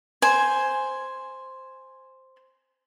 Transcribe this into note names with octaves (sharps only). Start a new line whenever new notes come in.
C5 G#5